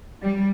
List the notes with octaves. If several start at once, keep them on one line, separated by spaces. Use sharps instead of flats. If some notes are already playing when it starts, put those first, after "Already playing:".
G3